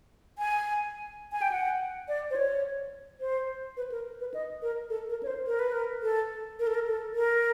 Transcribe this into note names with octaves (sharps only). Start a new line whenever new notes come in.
G#5
G#5
G5
F#5
D5
C5
C#5
C5
B4
A#4
B4
D#5
A#4
A4
A#4
C#5
C5
A#4
B4
A#4
A4
A#4
A4
A#4
A4
A#4